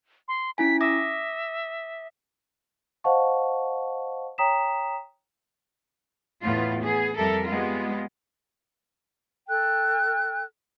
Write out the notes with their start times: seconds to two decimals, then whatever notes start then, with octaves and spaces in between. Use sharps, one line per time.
0.28 C6
0.58 C#4 E4 G#5 B6
0.81 E5 D6 D#6 A#6
3.04 C5 D#5 F5 F#5 A5 C#6
4.38 C#5 G5 A#5 D#6 B6 E7
6.41 E2 A2 B3 F4
6.82 B3 G#4
7.15 F2 G3 A4 A#4 E5
7.46 G3 G#3 B3 F4
9.48 A4 G5 F#6